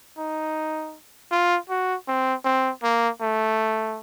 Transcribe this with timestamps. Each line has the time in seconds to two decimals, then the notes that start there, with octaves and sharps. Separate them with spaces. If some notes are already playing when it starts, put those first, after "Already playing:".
0.18 D#4
1.32 F4
1.70 F#4
2.08 C4
2.45 C4
2.83 A#3
3.21 A3